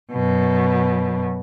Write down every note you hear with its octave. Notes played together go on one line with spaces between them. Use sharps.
F#2 B2